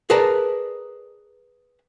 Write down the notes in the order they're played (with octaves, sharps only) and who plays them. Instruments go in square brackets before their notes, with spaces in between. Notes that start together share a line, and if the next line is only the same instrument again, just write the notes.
[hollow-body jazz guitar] G#4 A#4 B4 D5 A5 A#5